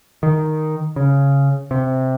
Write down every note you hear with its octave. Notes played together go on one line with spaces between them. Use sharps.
D#3
C#3
C3